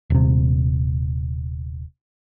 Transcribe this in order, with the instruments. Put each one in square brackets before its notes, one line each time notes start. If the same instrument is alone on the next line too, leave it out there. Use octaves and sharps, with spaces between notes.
[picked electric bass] D#1 C3